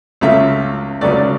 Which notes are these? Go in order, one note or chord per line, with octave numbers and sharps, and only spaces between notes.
C#2 C#3 F#3 A3 E5
C#2 C#3 F#3 A3 D5